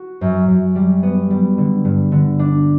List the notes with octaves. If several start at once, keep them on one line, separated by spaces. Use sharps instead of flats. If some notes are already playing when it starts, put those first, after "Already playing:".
Already playing: F#4
F#2
F#2
G3
B3
G3
D3
G2
D3
D4